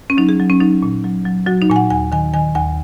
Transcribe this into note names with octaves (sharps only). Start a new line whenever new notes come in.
C#4
F#3 D#4
G#4
F#3
C#4
F#3 D#4
A#2
F#3
F#3
F#3 F#4
D#4
A#2 G#5
F#5
D#2 G#5
D#3 G#5
D#3 G#5
D#2 G#5